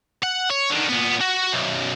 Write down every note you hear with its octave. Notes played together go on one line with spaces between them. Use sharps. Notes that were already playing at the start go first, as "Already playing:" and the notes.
F#5
C#5
D3 D#3
A#2 B3
F#4
B1 F#2